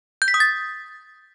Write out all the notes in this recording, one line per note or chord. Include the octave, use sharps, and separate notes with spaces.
G6
B6
D#6
A6